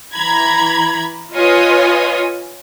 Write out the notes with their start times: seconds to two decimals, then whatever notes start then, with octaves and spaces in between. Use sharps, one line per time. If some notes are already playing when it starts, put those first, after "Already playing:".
0.14 E3 A#5 B5 G#6
1.33 F4 B4 C#5 D#5 G#5 D#6